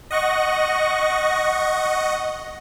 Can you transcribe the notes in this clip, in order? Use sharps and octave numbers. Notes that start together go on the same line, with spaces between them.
D#5 F#5 C#6 A#6